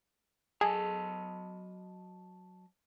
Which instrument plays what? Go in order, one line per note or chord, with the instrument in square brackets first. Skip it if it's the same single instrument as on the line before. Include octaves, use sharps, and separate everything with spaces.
[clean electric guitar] F#3 D#5 A5 [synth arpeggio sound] G#4